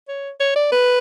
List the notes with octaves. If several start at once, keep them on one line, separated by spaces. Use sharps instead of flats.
C#5
C#5
D5
B4